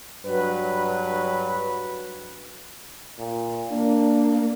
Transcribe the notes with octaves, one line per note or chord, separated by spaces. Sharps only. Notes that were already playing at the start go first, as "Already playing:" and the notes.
G2 F#3 B4
A#2
A#3 D4